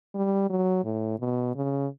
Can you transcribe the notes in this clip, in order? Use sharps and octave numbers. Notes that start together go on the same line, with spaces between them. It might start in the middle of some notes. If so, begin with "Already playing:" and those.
G3
F#3
A2
B2
C#3